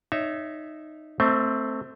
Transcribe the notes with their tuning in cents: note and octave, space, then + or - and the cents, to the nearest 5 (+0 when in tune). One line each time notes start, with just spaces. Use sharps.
D#4 -10 C#5 +20 E5 +0
A3 +20 C4 +0 E5 -40